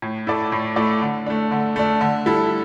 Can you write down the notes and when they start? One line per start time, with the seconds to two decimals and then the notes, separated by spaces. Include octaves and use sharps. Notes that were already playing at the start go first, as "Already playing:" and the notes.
0.02 A2
0.27 A3 E4 A4 D5
0.52 A2
0.76 A3 E4 A4 D5
1.02 D3
1.26 A3 D4
1.52 D3
1.76 A3 D4
2.01 D3
2.26 G3 E4 A4